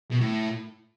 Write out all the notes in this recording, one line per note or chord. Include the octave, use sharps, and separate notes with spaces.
B2
A2